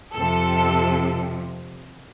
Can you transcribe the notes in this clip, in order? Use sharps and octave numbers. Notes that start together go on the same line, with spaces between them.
F2 C3 F3 A4